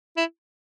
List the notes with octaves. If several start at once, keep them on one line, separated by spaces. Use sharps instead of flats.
E4